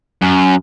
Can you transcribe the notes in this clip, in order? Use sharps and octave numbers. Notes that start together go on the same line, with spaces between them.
F#2